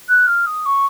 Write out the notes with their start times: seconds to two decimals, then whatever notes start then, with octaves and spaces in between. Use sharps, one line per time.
0.08 F#6
0.27 F6
0.46 D#6
0.66 C#6